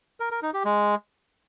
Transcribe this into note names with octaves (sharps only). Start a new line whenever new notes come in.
A#4
A#4
D#4
G4
G#3